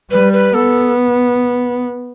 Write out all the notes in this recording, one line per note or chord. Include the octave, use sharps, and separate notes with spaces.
G3 B4
B4
B3 A4